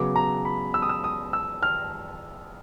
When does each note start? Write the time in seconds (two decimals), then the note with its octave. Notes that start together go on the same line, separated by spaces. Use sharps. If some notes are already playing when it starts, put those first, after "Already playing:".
Already playing: C#3 F#3 B3 D6
0.16 A#5
0.45 B5
0.74 E6
0.82 D#6
0.89 E6
1.04 D#6
1.33 E6
1.63 F6